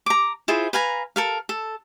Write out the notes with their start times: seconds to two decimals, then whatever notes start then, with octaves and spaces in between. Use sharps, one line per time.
0.06 A#5 D6
0.48 E4 F4 G#4 C5
0.73 B4 F5 G#5 A#5
1.16 A4 A#4 F5
1.49 A4